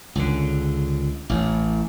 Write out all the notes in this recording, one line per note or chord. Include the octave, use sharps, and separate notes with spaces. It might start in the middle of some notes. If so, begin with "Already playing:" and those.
C#2 D3
A1 A2